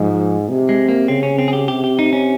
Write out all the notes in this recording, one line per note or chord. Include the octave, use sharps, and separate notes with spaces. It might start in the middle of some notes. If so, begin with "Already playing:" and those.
Already playing: G#2 F3
C3
G#3
A#3
C#3 C4
C#4
C4
G#4
G4
C3 G4
G4
D#4
C#4